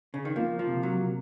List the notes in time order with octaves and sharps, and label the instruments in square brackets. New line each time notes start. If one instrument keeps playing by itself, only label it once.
[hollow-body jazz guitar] C#3
D#3
[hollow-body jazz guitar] F3 [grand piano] A#3
[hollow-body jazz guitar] F3
[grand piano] C3
[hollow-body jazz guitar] F#3
[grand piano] C3